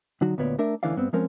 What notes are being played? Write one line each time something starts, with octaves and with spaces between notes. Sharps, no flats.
D3 F#3 D#4 F#4
D2 A#2 B3 C#5 D5
A3 D4 A#4 E5
D2 D3 E3 C#4 D5 F5
G2 B3 C4
F3 G#3 C4 C#4 A#4 C5